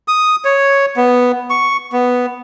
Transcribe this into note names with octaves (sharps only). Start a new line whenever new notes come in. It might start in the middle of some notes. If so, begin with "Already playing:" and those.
D#6
C#5
B3
C#6
B3